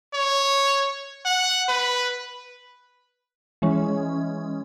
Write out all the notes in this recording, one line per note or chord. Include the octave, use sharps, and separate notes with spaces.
C#5
F#5
B4
E3 G#3 C#4